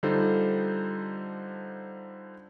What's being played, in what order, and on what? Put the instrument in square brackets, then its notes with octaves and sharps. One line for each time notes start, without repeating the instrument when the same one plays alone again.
[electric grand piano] D3 G3 D#4 F4 A4 C5